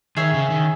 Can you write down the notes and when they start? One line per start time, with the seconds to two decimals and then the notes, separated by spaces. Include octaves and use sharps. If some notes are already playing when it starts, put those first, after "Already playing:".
0.17 D#3 G#4 C#5 E5
0.34 C#3
0.50 D#3